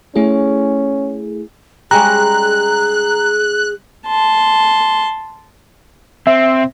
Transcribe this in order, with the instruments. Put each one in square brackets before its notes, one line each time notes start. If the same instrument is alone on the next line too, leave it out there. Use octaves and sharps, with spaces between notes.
[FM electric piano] A3 E4 G#4 [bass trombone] C#4
[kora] G3 G#3 C#4 [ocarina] G#4 [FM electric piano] A#5 [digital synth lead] F#6
[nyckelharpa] A5 C6
[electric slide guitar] C4 [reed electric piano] E5